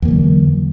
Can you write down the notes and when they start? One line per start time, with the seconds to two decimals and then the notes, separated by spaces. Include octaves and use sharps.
0.02 E2
0.05 A#3
0.08 D3
0.11 F#3